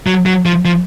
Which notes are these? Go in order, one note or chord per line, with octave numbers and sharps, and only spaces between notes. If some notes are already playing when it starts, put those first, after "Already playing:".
F#3
F#3
F3
F3